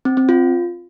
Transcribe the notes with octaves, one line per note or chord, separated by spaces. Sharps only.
C4
C4
F4